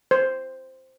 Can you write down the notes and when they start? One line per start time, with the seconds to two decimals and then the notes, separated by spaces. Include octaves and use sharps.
0.11 C5